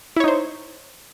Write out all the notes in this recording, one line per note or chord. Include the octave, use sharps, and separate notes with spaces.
D#4 E4 C5 C#5